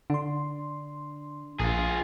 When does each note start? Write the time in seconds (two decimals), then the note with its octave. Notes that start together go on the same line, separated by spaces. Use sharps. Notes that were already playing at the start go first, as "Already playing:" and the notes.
0.10 D3 D4 C6
1.59 A#1 F4 G#4